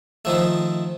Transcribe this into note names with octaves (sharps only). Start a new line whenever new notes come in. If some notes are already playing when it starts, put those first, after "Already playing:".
D#3 F3 A3